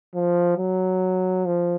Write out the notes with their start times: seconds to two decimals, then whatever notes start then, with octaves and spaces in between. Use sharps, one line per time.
0.15 F3
0.58 F#3
1.46 F3